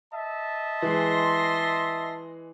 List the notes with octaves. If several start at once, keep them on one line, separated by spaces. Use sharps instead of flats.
D#5 E5 A5
E3 G#3 C6 A#6